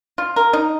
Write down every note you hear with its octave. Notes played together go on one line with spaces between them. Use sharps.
F4
A#4
D#4